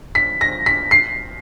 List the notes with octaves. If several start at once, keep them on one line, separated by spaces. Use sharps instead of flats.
B6
A#6
B6
C7